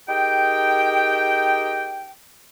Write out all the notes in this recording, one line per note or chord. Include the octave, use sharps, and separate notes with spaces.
D#4 G4 G#4 A#4 G5